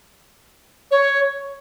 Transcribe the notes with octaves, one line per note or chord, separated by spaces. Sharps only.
C#5